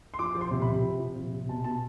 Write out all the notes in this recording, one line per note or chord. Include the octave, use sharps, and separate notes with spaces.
C6
F3 D6
F3
C6
C3
B5
C3
F3
F3
C3
C3
B2 A5
B2 A5